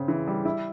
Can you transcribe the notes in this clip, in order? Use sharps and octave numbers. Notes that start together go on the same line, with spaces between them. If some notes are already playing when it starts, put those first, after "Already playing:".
Already playing: C#3 C4
E3
G3
E4